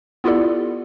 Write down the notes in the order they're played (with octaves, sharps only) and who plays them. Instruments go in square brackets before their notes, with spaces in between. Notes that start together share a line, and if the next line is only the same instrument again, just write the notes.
[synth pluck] B3 E4 F4 G4 A4 D5